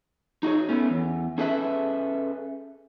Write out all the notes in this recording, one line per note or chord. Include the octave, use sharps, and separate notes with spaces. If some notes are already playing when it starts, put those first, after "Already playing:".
D#4 F#4 G#4 C#5
A3 B3 C#4
E2
C#4 G#4 A4 B4 E5